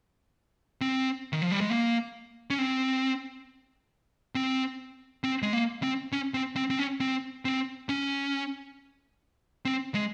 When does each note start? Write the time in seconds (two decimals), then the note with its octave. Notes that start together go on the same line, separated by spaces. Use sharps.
0.81 C4
1.33 D#3
1.42 F3
1.51 G3
1.61 G#3
1.70 A#3
2.50 C#4
2.58 C4
4.35 C4
5.24 C4
5.42 G#3
5.53 A#3
5.83 C4
6.12 C#4
6.34 C4
6.56 C4
6.70 C4
6.79 C#4
7.00 C4
7.45 C4
7.89 C#4
9.65 C4
9.94 G#3